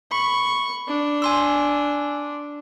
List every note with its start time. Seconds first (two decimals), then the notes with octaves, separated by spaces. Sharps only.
0.11 B5 C#6
0.88 D4
1.22 G#5 C6 E6